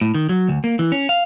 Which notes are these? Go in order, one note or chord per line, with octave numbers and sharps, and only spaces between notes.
A2
D#3
F#3
D2
A#3
E3
C#4
F5